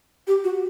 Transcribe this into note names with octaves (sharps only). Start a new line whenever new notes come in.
G4
F#4